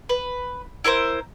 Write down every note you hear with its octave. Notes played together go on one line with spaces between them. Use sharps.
B4
E4 A4 A#4 C5